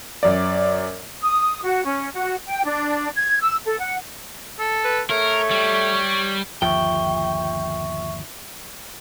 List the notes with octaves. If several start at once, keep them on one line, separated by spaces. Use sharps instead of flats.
F#2 D5
D#6
F#4
C#4
F#4
G5
D4
G#6
E6
A4
F#5
A4
B4
A3 A#4 C#5
G3
G1 D#2 F3 E5 G5 C#6